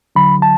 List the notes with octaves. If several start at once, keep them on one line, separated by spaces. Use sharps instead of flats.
D2 D3 F#3 B5
A5